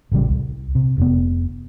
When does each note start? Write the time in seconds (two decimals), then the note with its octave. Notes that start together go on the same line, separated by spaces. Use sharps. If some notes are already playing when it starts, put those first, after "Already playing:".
0.12 A1 C#3 E3 G3
0.30 C2
0.75 C3
0.98 F1 B3